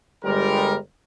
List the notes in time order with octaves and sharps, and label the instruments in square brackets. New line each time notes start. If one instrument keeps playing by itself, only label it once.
[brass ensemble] G1 G3 G#3 A#4